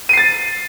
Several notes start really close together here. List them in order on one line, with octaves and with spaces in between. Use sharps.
D#7 C7 A6